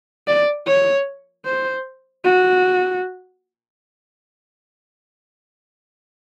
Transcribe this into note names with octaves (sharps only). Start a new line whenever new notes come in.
D5
C#5
C5
F#4